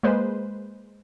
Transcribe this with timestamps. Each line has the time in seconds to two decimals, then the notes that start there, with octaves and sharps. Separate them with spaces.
0.03 G#3 A#3 B4 C5